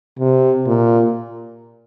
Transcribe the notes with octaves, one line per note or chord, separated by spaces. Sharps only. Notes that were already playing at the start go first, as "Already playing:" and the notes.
C3
A#2